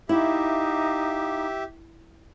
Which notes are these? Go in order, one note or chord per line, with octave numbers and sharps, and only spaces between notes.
D#4 E4 G4 E5 F5 D6